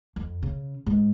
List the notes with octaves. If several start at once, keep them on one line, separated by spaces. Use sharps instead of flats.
F2
C#3
G#2